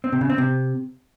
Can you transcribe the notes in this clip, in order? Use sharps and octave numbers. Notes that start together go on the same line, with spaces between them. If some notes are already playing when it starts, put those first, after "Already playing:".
C4
C3
C#3
C4
C3